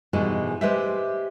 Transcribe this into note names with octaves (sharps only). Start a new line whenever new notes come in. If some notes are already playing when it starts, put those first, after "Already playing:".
G#2 B2 D#3 E3 G3 G#3
G#3 G4 B4 C5 D5 E5